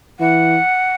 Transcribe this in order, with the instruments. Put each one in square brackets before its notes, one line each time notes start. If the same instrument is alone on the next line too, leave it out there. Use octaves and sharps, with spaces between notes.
[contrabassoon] E3 [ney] F#5